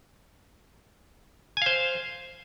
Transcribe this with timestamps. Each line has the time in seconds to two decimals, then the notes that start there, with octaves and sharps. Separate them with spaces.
1.57 G#5
1.62 F5
1.66 C5